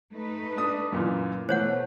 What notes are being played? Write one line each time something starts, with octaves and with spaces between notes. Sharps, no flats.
A3 D#4 B4
D4 D#6
F#2 A#2 E3
B2 E3 A3 C5 C#5 F#5